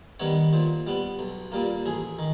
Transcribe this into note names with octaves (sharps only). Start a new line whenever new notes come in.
D#3 G3 B3 C#5
A#2 C5
G3 B3
B1
A#2 G3 A#3
A1 G#4
D#3